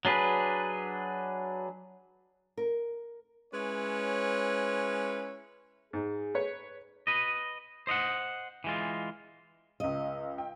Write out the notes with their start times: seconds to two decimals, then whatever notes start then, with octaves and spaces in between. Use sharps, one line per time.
0.05 F#3 D4 G#4 B4
2.57 A#4
3.53 G#3 C#4 E4 B4 C#5
5.93 G#2 G#4
6.35 B4 C#5
7.07 B4 D#5
7.87 C5 D#5 F5 F#5
8.64 E3 G#3 F4
9.80 C#2 C#3 D#5
10.38 G5